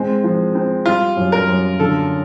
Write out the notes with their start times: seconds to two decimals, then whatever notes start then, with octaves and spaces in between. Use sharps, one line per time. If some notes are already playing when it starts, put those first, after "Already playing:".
Already playing: G#3 C4
0.24 F3
0.55 C4
0.85 G3 F4
1.17 F#2
1.32 A#4
1.48 F#2
1.80 D3 A4